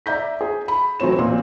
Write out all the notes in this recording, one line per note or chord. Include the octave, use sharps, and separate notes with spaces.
D5 E5 A#5 G6 B6
G#4
B5
E3 F#3 A3 C4 C#5 E7
A1 A#2 C4 C5